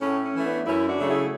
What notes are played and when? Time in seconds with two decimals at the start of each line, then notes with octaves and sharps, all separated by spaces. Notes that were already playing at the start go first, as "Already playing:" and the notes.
0.01 A2 C#4
0.23 C#4
0.34 E3 A3
0.44 B3 D4
0.66 F#2 C#4 E4
0.87 D4 F#4
0.98 C#3 F#3 A3
1.09 E4 G#4